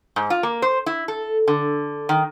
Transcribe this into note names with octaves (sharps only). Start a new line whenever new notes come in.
G#2
F4
A#3
C5
E4
A4
D3
D#3